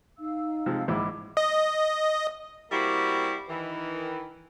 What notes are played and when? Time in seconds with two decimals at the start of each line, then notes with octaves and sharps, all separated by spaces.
0.19 D#4 F5 E6
0.66 C3 F3 G#3
0.88 A#1 G#2 E4 B5 D6
1.37 D#5
2.71 G3 A#3 C4 E4 F#4 G4
3.48 D#3 E3